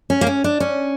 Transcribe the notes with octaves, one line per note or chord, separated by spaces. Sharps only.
C#4
A#3
C#4
D4
C#4